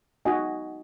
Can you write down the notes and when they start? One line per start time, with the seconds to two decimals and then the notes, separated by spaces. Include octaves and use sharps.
0.25 D#4 F#4 D#5 G#5